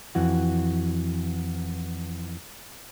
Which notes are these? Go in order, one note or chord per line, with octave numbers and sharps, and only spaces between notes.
F2 E3 F#4